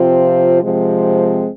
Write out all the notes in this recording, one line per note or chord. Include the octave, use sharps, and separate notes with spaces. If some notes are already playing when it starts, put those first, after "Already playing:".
Already playing: C3 F3 C4 F4
C3 F3 G#3 C4